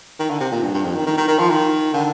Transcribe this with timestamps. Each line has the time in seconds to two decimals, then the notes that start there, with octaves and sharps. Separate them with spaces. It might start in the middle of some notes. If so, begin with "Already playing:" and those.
0.20 D#3
0.30 D3
0.40 C3
0.52 A#2
0.63 G2
0.74 G2
0.85 F2
0.95 D#3
1.07 D#3
1.17 D#3
1.28 D#3
1.39 F3
1.50 D#3
1.94 D3